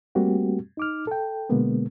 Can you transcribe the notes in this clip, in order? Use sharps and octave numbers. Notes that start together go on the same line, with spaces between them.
G3 A3 A#3 C4 F#4 G4
D#4 D6 F6
A4 G5
B2 D3 G#3 A#3 B3